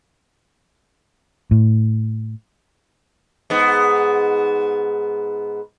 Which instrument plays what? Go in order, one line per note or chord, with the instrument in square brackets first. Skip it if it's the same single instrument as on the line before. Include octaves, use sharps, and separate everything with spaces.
[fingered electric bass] A2
[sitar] G#2 B3